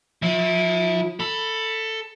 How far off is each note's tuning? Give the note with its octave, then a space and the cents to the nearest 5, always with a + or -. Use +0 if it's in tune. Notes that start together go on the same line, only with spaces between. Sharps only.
F3 +35 E4 -15
A4 +15 B5 +0